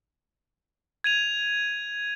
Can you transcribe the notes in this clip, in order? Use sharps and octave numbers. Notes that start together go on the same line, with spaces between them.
G#6 D#7 F7